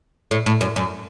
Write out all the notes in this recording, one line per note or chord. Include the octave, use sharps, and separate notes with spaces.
A2
A2
F#2
F#2